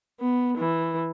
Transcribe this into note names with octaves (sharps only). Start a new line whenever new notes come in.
B3
E3